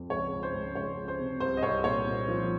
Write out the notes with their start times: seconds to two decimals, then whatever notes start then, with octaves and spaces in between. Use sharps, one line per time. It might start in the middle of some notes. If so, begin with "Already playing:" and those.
Already playing: F2
0.10 C#2 C#5
0.32 C#2
0.43 C5
0.53 C#2
0.75 C#2 C#5
0.97 C#2
1.08 C5
1.19 C3
1.40 C2 C5
1.57 D#5
1.63 C2 C#5
1.84 A#2 C#5
2.06 A#2
2.28 F3